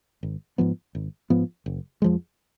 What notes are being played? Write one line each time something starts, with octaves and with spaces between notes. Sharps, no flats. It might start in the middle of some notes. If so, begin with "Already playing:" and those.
G#1
G#2 F3 B3
G#1
G#2 F3 B3
F#1
F2 F3 G#3